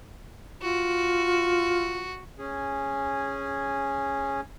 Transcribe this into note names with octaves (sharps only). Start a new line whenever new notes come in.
F4 F#4
C#4 G#4